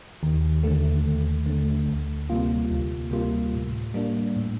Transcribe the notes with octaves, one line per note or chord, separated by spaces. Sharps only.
D#2
D3 A3
D#2
D3 A3
D2
C3 G3 A#3 F4
D2
C3 G3 A#3 F4
A2
G3 A#3 D4
A2